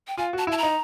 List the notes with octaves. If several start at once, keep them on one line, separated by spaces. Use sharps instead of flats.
G5
F4 G#5
F#4 A5
E4 A5
A#5
D#4